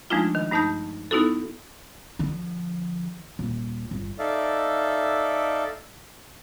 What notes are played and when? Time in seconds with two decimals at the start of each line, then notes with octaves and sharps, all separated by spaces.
0.10 F3 G#3 A3 D4 D#4 F4
0.35 D#3
0.51 G2 A3 D#4 A5 G6
1.11 B3 D#4 E4 F#4 A4
2.19 D3 F3
3.39 D#1
3.91 G1
4.19 D#4 A4 D5 E5 F5